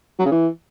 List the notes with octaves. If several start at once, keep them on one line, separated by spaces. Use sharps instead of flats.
F#3
C#3
E3